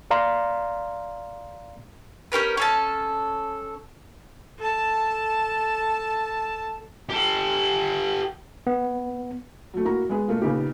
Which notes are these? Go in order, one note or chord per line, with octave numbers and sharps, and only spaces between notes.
D5 F5 A#5 C6
C#4 G4 A#4 B4
C#4 A4 A5
A4 A5
G4 A4
B3
F#3 A3
A#3 E4 F#4 A#5
G#3 B3 G#4
B2 A3 A#3 F4
A#2 C#3 B3 D#4 F4 G4